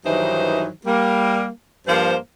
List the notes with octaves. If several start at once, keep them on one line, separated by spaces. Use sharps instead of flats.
G2 D#3 E3 F#3 D#4 C5
G3 A#3
G2 F3 A#3 C5